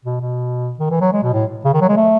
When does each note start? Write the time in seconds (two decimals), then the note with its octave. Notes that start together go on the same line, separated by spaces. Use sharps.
0.05 B2
0.21 B2
0.79 D#3
0.90 E3
1.01 F#3
1.12 G#3
1.23 B2
1.33 A2
1.64 C#3
1.73 D#3
1.81 F#3
1.88 G#3
1.96 A3